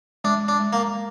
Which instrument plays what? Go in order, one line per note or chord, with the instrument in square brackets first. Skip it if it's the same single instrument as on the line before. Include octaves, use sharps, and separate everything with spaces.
[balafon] G#3 [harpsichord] D4
[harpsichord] D4
[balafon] G#3
[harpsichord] A#3